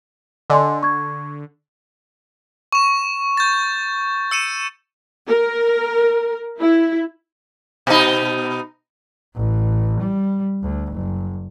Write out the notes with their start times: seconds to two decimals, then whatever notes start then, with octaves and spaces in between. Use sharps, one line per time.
0.50 D3 D#5 G#5 C6
0.83 C#6 G#6
2.72 C#6 E7
3.37 G6 A6
4.31 E6 C#7 D#7 E7
5.27 A#4
6.59 E4
7.87 B2 D#4
9.36 A1
10.00 G3
10.62 D2
10.92 F#1